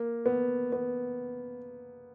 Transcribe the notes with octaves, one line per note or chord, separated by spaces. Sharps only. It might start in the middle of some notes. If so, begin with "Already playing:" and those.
Already playing: A#3
B3
B3